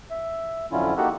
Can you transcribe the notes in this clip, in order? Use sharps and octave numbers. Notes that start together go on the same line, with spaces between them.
E5
F2 D3 F#3 C#4 E4 F4
A#3 D#4 F#4 G4 A4 F#5